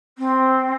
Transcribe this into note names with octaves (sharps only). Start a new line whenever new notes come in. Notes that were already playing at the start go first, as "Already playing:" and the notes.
C4